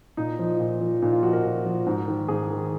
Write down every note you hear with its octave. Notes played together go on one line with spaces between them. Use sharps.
A#2 D#4
F3
A#2
F3
A#2 D#4
F4
F3 F#4
A#4
A#2
F3
G#2
D#3
G#2 G#4
D#3